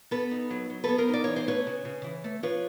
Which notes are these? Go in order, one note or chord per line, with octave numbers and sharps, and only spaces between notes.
B3 A4 B4
D#4
F#3
F#3
B3 A4 B4
A#4 C5
D#4 D5
E3 C#5
C5
A3 B4 C#5
C#3
C#3
E3
A3
F3 B4 C#5